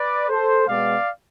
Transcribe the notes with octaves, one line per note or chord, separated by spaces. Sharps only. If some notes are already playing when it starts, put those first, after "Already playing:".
Already playing: B4 D5
A4 C5
B2 G#3 B3 D5 F5